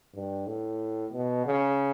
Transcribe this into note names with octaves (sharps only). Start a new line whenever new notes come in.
G2
A2
B2
C#3